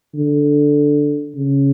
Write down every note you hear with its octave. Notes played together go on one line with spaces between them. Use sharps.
D3
C#3